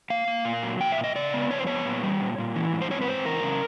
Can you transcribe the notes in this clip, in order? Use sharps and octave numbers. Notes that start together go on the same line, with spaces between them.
A#3 F5
A#3
A#2
F#3
A#2 G5
E5
A#2
D#5
C#3 D5
B3
F2 C#5
C5
B3 C#5
A#2
G3
A#2
A#2
E3
G#2
C5
C4 C#5
B4
G#2 C5
E3 A#4
C#3